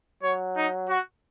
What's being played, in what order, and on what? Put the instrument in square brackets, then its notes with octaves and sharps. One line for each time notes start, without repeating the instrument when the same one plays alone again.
[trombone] F#3 [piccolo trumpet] C#5
[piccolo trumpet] D#4
F#4